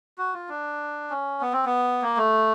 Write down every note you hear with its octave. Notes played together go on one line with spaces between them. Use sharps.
F#4
F4
D4
C#4
B3
C4
B3
A#3
A3